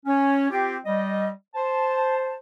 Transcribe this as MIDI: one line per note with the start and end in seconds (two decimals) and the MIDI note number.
0.06 0.49 61
0.51 0.77 60
0.51 0.77 65
0.51 0.77 67
0.86 1.28 55
0.86 1.28 75
1.55 2.34 72
1.55 2.34 81